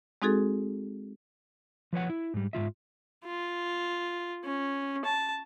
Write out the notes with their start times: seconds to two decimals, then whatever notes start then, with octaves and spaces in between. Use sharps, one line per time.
0.22 G#3 C4 D#4 F#4 G#4 A4
1.93 F3 B4 C#5 F#5
2.09 E4
2.34 G#2 G3
2.53 G#2 F3 F4 E5
3.25 F4
4.44 C#4
5.05 A5